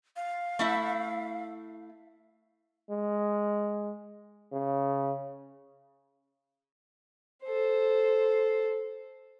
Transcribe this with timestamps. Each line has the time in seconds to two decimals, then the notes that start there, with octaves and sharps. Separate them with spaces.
0.16 F5
0.59 A3 E4 E5
2.90 G#3
4.53 C#3
7.44 A4 C5